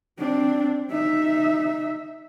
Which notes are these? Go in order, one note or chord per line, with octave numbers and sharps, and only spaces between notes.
C4 D4
D#4 E5